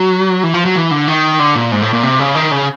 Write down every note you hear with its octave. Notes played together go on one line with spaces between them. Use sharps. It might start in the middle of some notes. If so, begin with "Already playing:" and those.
Already playing: F#3
E3
F3
F#3
E3
D3
D#3
D3
A#2
G#2
A2
A#2
C3
C#3
D#3
C#3